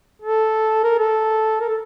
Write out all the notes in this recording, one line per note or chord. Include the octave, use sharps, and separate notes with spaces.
A4
A#4
A4
A#4
A4